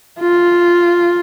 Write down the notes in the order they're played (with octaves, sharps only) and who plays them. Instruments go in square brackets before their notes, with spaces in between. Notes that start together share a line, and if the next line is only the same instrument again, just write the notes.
[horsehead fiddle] F4